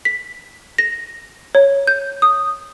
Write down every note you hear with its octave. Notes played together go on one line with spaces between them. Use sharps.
B6
A#6
C#5
G6
D#6